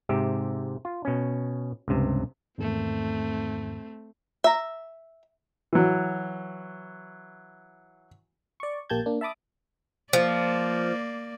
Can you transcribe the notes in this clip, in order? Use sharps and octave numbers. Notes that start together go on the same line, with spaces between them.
G#2 C3 G4 E5
F4
B2 C#4
C#2 G2 C3
E2 G#2 D#3 A3 C4
E5 A#5
E3 F#3
D5 C#6
A#1 A#3 G4 A5 G6 G#6
A#3 D4
E5 A5 B5 D6 D#6
F3 A#3 D5